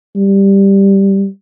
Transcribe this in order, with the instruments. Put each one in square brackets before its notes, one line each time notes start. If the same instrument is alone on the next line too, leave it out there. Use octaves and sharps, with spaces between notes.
[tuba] G3